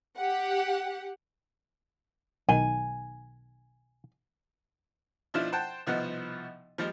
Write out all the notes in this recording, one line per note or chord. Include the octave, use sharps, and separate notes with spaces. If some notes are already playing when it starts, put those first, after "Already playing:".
G4 F#5
B1 D#3 G#5
B2 F3 D4 E4 F4
C5 F#5 G5 A5
C2 B2 F3 B3 D#4 F#5
F3 G3 G#3